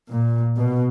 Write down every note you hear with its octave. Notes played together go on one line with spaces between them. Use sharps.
A#2
B2